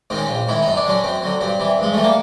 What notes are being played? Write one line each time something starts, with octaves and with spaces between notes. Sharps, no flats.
G#2 D#3 C4
C#4
A#1 C4
G#2 D#3 E4
F#2 D#4
D4
D3 F#3 C#4
F#2 C4
D3 F#3
G2 C4
E3 G3
G2 G#3
E3 G3 A3
A#3